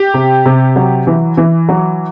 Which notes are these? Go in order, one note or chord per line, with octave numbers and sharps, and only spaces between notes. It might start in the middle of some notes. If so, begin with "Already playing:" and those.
Already playing: G4
C3
C3
F#3
E3
E3
F#3